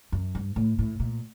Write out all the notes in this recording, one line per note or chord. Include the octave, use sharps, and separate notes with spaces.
F#2
G2
A2
A2
A#2